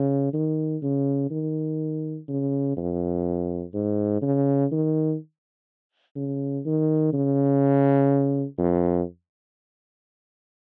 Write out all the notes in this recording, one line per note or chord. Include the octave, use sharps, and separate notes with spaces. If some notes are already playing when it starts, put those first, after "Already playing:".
Already playing: C#3
D#3
C#3
D#3
C#3
F2
G#2
C#3
D#3
C#3
D#3
C#3
F2